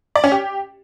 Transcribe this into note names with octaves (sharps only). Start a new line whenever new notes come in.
D5
C#4
G4